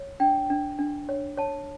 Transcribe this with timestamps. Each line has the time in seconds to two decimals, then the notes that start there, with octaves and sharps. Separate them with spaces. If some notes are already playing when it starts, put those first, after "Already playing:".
Already playing: C#5
0.20 D4 G5
0.50 D4
0.79 D4
1.09 C#5
1.37 C#5 A5